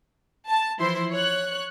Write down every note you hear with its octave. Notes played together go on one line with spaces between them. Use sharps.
A5
E3 F3 E4 C5 C6
C#5 F#6